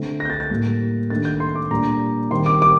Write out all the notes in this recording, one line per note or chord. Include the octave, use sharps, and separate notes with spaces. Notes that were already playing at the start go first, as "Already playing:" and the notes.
Already playing: D3 A3 C4
A#6
G6
A6
A6
A2 G3 A#3
D#3 A3 D4 A6
G6
C6
D6
A#2 G3 D4 A#5
D#3 G3 C4 C6
D6
D6